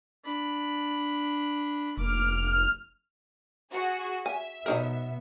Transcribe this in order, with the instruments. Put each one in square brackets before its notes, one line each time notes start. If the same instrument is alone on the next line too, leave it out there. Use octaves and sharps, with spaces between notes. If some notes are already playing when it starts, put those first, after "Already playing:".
[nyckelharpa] D4 B5
[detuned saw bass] F1 [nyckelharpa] A#3 D6 [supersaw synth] F6
[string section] F#4 G#4
[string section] E5 [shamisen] G#5
[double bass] B2 B3 [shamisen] F#3 D#4 A#4